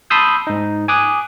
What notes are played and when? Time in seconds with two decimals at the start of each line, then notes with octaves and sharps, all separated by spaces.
0.10 A5 B5 C6 D#6 E6 G6
0.47 G#2 D#4
0.88 G#5 D6 D#6 F#6